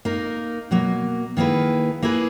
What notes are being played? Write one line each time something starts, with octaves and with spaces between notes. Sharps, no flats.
A#3 D#4 A#4
B2 F#3 A#3
D#3 A#3 E4 G#4 B4
A#3 E4 G#4 B4